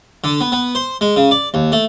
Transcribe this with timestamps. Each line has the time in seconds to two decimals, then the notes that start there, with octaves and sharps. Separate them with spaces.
0.24 D3
0.41 B3
0.52 B3
0.75 C5
1.01 G#3
1.16 C#3
1.31 D5
1.54 D#2
1.72 A3